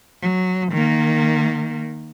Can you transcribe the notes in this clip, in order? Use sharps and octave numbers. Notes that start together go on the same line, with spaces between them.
F#3
D#3 A#3